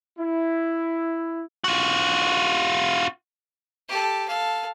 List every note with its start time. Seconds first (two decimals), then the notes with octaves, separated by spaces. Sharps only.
0.17 E4
1.64 F4 F#4
3.88 G4 A4
4.28 A4 F5